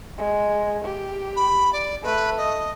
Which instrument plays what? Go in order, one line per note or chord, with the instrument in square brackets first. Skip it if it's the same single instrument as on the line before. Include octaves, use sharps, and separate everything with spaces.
[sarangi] G#3
G4
[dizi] B5
D5
[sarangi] A3 [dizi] B4
[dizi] D#5